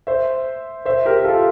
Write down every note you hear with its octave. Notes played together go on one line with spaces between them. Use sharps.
C5 E5
C5 E5
G4 A#4
F4 A4